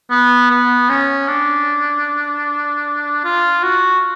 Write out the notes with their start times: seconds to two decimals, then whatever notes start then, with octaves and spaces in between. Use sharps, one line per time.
0.11 B3
0.50 B3
0.89 C#4
1.28 D4
3.24 F4
3.63 F#4